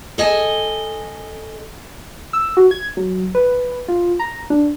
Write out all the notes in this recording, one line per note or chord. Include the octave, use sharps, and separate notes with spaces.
A4 D#5 G#5
E6
F#4
G#6
F#3
B4
F4
A#5
D4